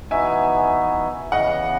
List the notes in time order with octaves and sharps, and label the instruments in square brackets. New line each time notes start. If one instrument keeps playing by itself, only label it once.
[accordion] E3 B3 D#4 F#4 [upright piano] E5 G#5
[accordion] C#3 E3 B3 [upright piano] D#5 F#5